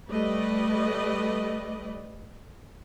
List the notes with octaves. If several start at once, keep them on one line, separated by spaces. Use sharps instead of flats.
G3 A3 B4 D5 D#5